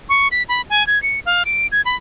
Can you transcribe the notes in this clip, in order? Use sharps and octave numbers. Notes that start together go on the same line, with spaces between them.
C#6
B6
B5
G#5
G#6
C#7
F5
D7
G#6
B5